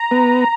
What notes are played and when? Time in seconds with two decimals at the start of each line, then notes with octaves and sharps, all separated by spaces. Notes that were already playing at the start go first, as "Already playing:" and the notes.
Already playing: A#5
0.11 B3